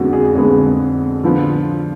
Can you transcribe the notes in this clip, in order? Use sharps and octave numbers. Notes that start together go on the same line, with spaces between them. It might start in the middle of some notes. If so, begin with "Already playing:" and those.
Already playing: F2 D3 G#3 B3 F#4
G#4
F2 D3 G#3 B3 G#4
D3 F3 B3